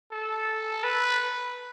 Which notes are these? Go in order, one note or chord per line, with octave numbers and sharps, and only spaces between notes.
A4
B4